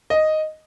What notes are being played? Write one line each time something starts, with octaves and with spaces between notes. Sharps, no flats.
D#5